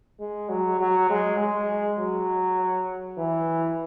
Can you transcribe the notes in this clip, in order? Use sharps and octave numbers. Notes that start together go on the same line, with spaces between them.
G#3
F#3
F#3
G#3
G#3
F#3
E3